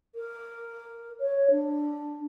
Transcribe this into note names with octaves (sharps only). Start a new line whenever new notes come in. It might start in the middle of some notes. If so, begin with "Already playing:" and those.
A#4
C#5
D4